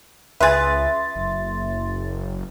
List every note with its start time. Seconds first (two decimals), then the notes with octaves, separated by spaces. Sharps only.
0.40 C#2 G#4 B4 E5 C6 A6
1.16 F#1